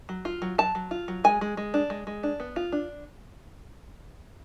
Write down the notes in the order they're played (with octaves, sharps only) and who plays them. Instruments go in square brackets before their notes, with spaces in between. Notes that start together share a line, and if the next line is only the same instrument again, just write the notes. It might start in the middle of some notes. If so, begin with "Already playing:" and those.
[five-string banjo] F#3
F4
F#3
F#3 A5
F#3
F4
F#3
G#3 G#5
G#3
G#3
D4
G#3
G#3
D4
B3
F4
D4